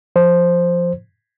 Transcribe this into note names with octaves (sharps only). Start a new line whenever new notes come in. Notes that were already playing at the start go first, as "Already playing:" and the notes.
F3 C5